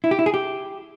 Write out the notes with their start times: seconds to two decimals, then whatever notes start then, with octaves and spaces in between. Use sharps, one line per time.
0.04 E4
0.11 G4
0.19 E4
0.26 G#4
0.34 G4